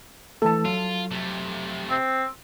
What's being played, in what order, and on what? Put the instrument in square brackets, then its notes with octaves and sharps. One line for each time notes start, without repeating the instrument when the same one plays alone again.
[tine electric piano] E3 A3 [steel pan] A4 A5
[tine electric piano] F#3 [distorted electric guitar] F4
[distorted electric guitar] C3 A3
[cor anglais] C4